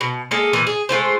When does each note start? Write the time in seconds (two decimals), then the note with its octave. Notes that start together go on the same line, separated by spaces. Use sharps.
0.01 B2
0.31 G#3 A#3 G#4 A4
0.53 A#2 E3
0.67 G#4
0.89 G#3 A3 F4 C5